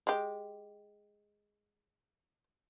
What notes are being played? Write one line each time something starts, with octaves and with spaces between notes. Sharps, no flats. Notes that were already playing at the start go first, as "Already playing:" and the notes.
G#3 G4